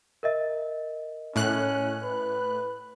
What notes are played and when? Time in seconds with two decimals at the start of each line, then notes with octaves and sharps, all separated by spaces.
0.23 A#4 D#5 E5
1.36 A2 C#4 F#6
2.03 B4